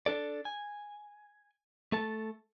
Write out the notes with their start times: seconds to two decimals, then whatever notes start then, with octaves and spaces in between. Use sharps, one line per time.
0.06 D4 A4 D5
0.45 G#5
1.92 A3 A4 A5